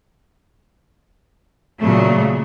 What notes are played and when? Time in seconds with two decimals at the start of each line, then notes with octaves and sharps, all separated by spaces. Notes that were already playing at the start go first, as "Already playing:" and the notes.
1.79 A#2 C#3 F#3 A3